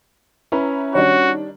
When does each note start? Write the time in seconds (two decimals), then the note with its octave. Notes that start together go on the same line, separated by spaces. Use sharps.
0.52 C#4 E4 B4 A#5
0.95 D#3 G3 D4 F#4 C#5